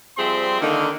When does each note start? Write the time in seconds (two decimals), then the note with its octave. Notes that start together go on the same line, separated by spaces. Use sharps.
0.18 F3 G3 C4 G#4 E5 C6
0.61 D3 D#3 A#3